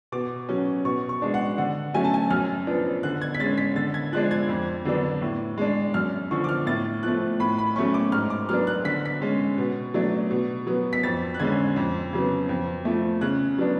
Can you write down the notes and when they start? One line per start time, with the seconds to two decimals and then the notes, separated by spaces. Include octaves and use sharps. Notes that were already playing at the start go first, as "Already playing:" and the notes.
0.12 B2 D6
0.49 F#3 C#4
0.85 B2 C#6
1.09 C#6
1.22 G#3 D4
1.34 F#5
1.58 D3 F#5
1.94 F#3 A3 C#4 G#5
2.04 A5
2.14 G#5
2.30 F#2 F6
2.67 F3 B3 D4
3.03 D3 F#6
3.22 G#6
3.35 B6
3.40 G#3 C#4 A6
3.58 B6
3.76 D3 A6
3.94 G#6
4.12 F3 G#3 D4 F#6
4.31 G#6
4.49 F2
4.85 D3 F#3 B3 D4
5.21 A2
5.58 G#3 D4
5.94 F#2 F6
6.31 D3 F3 C#6
6.44 D6
6.49 F6
6.66 A2 A6
7.03 F3 A3 F#6
7.40 A2 B5
7.58 B5
7.76 F#3 A3 C#4 C#6
7.94 D6
8.12 G#2 F6
8.30 D6
8.49 F#3 B3 D4 F6
8.67 F#6
8.85 D3 B6
9.05 B6
9.22 G#3 C#4
9.58 B2
9.94 F#3 A3 D4
10.31 B2
10.67 F#3 B3
10.93 B6
11.03 F2 A6
11.34 F#6
11.40 D3 G#3 C#4 G#6
11.76 F2
12.13 C#3 F#3 B3
12.49 F2
12.85 F3 A3
13.21 C#3 F#6
13.58 F#3 B3 D4